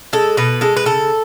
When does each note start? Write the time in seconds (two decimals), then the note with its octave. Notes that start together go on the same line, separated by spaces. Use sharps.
0.13 G#3 A4
0.37 B2 B4
0.61 G#3 A4
0.77 B4
0.85 C#3 A4